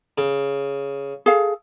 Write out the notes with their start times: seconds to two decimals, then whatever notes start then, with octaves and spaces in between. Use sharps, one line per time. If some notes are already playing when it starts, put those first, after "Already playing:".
0.18 C#3
1.26 G#4 A4 F5